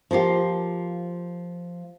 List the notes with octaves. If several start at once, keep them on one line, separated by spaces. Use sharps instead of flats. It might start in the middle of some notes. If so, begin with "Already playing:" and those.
F3 A#3 F4 G4